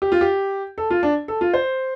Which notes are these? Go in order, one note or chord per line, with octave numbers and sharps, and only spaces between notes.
G4
F4
G4
A4
F4
D4
A4
F4
C5